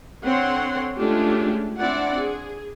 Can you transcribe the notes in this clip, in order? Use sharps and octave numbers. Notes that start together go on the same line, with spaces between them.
D3 C4 C#5 F#5 C6
G#3 A3 C#4 D4 F4 G4
C4 D4 E4 D5 F#5
G#4